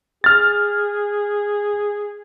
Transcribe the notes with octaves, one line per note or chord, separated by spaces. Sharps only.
G#4 F6 A6